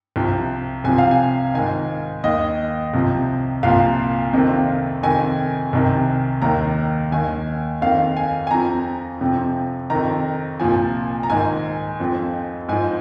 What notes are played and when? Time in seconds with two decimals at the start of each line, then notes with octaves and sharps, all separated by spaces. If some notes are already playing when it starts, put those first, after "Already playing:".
0.16 C2 C3 F3
0.84 C2 C3 F3 G#5
0.98 F5
1.11 G#5
1.54 G#2 D#3 G#5
2.24 D#2 D#3 D#5
2.94 C2 C3 F3
3.63 C2 A#2 F3 F5
4.33 F2 C3 D#3
5.03 F2 C3 D#3 G#5
5.73 C2 C3 D#3
6.42 D#2 D#3 A#5
7.12 D#2 D#3 G#5
7.82 F2 D#3 F5
8.17 G#5
8.47 G#5
8.51 F2 F3 A#5
9.21 F2 C3 F3
9.90 F2 D#3 A#5
10.60 C2 A#2 F3 G#5
11.23 A#5
11.30 G#2 D#3 G#5
12.00 F2 F3
12.69 G#2 F3 G#5